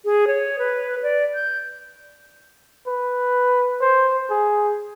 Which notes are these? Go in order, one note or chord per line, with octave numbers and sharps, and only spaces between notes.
G#4
C#5
B4
D5
G6
B4
C5
G#4